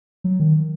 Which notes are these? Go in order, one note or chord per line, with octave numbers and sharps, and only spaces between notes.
F#3
D#3